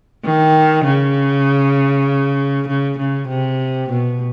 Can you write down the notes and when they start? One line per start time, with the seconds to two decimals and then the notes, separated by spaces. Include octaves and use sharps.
0.25 D#3
0.85 C#3
2.68 C#3
2.98 C#3
3.28 C3
3.90 B2